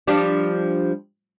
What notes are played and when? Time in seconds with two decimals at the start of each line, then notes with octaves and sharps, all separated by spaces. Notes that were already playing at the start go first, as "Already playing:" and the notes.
0.07 F3 G3 D4